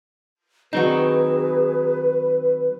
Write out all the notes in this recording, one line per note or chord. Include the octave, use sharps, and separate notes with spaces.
D#3 F#3 C4 D#4 F#4 G#4 B4